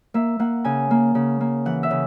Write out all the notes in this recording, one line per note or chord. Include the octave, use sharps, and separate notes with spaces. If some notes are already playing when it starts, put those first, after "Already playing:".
A#3 E5
A#3 F#5
C#3 G#5
A#3
C#3
A#3
E3 F#5
E5
C#3